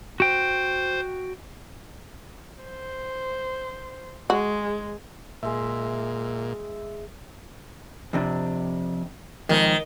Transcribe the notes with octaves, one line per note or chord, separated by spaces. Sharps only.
F#4 C5 G5
C5
G#3 F#4
A#2 G#3 E5
F2 C3 D4
F2 G#2 D#3